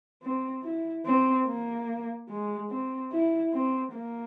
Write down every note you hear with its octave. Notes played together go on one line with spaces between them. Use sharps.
C4
E4
C4
A#3
G#3
C4
E4
C4
A#3